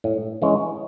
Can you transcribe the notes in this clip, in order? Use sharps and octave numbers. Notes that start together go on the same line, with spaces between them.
A2
E3 G#3 C#4